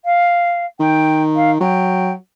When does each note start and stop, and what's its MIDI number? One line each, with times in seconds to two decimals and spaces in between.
0.05 0.65 77
0.80 1.57 51
0.80 1.22 79
1.35 1.50 77
1.60 2.13 54
1.60 2.12 79